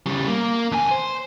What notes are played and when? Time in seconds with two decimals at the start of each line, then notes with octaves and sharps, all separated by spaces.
0.06 C#3 G3
0.27 A#3
0.72 F2 G#5
0.91 C5